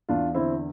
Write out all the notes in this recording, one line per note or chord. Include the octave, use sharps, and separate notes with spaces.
E2 D4 F4
D3 C4 E4